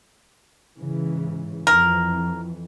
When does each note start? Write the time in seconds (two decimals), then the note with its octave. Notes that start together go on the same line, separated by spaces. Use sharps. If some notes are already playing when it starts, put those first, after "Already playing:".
0.78 G#2 C#3 E3
1.67 F2 E3 A#4